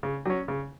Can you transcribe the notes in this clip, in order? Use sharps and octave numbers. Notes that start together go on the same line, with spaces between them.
C#3
F#3 C#4
C#3